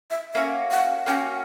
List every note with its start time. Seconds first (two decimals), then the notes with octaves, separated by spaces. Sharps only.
0.11 E5
0.34 A#3 C#4 F#4 E5
0.71 F#5
1.06 A#3 C#4 F#4 G5